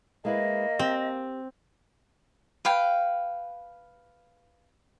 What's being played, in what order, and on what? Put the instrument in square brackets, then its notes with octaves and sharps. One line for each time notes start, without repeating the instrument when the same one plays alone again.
[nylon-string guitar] G#3 E4 B4 [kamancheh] A#3 [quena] D#5
[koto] C4 [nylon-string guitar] G4
[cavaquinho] B4 F5 G5